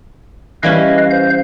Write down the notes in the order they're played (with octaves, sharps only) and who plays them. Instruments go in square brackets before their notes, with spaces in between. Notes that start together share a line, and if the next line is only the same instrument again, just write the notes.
[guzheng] E3 G3 C#4 [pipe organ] B4 D#5 F5
[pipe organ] C5 F5 G6